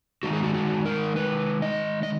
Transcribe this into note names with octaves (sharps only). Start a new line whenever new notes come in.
D#3 G#3 D#4 F#4
G#4
F#4
F#4
A#4
B4
D#5
D#5